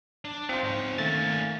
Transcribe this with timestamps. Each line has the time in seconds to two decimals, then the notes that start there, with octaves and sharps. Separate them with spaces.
0.25 D4
0.49 C4 D#4 F4 C5
0.63 G#2 C#5
0.98 D#3 A3 A#3 C#4 A6